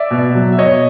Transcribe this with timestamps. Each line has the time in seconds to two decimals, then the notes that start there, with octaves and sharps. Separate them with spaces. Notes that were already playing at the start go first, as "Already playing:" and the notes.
Already playing: D5 E5
0.11 B2
0.35 F#3
0.52 E5
0.58 B2 C#5 D#5